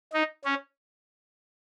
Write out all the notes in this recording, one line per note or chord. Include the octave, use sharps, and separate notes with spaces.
D#4
C#4